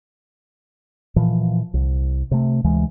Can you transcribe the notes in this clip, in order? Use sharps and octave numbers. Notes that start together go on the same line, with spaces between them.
A#2 E3 F3
C2
C3 A3
D2 E3 G#3